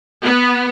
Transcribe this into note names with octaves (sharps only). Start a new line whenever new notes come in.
B3